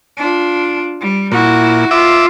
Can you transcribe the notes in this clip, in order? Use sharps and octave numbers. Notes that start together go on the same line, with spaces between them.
D4 F4
G3
A#2 E4 F#4
F4 E5 D6